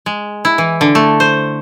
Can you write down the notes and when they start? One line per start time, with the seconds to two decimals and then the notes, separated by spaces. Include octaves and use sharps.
0.06 G#3
0.45 E4
0.58 E3
0.81 D3
0.95 A3
1.20 C5